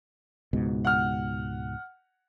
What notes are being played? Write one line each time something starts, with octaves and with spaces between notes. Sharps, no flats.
C#2 G#2 B2
F#5 F6